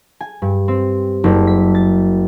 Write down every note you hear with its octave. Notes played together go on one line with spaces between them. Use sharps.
G#5
G2
C4
F#1
B6
A6